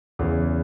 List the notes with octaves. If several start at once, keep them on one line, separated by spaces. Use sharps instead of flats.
E2 C#3 E3